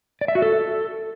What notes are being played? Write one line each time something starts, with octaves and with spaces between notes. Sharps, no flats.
D5
E5
F#4
A4